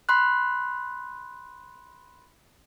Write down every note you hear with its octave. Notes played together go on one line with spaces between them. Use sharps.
B5 C6 F#6